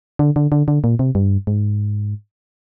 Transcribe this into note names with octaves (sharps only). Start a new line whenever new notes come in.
D3
D3
D3
D3
A#2
C3
G2
G#2